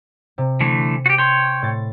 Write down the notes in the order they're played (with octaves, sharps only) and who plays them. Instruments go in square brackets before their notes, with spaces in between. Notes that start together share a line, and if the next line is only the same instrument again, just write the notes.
[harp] C3
[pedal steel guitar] D3 E3 A3
F#4 G4
[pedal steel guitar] C#5 G5 [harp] C6
[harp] A2 A6